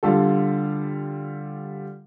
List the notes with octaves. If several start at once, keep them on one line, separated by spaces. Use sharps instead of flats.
D3 G3 F4 A4